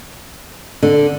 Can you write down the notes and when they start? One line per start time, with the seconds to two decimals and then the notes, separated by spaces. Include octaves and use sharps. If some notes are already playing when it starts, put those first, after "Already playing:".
0.83 D3